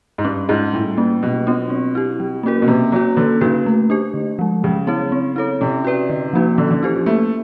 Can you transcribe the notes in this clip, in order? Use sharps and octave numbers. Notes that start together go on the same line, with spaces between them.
G#2
G2 C#4
G#2 F4 G#4
A2 G3
A#3 C#4
B2 F#3
B3 D4 F4
C4
E4 G4
F#3
A#3 C#4 F#4 A#4
B2
C3 A#3
F#3 C#4 F#4
D3 A#3
C#3 D#4 F#4 B4
A3
D4 G4 C5
D3
F3 G#3
C#3 F#3
B3 E4 G#4 C#5
C4
E4 A4 C#5
C3 C#4
F#4 B4 D5
D3
F3 A#3 D#4 F#4
D3 C#4
D3
E3 E4 G4 C5
F3
A3 A#3